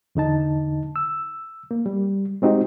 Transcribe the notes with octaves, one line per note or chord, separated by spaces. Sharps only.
E2 D3 D#4 A5
E6
A#3
G3
G#3 C4 D#4 F#4 G4